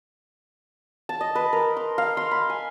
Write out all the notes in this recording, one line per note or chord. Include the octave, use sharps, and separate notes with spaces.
A5
D#5
B4
A#4
C6
F5
C6
B5
G#5